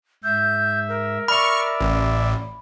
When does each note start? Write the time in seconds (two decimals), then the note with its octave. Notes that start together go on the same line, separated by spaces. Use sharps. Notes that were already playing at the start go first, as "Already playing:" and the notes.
0.24 G#2 E5 G6
0.89 A#4
1.28 D5 E5 B5 C#6 F6
1.81 A1